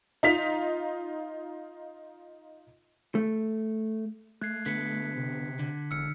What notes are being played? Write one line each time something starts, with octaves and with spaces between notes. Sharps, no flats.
D#4 F4 B6 F7
A3
A3 F#6 G#6 C7
D3 B3 B6 C#7
C3
D3
E1 E6 F6 C#7